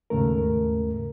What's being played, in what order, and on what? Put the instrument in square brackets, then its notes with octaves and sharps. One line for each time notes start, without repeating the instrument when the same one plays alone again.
[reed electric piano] D#2 G#2 C#3 A3 A#4